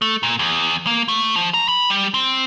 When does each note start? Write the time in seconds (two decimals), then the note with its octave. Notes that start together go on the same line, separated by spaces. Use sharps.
0.02 A3
0.23 A#2
0.39 E2
0.87 A#3
1.08 A3
1.36 F3
1.54 A#5
1.68 B5
1.90 G3
2.14 C4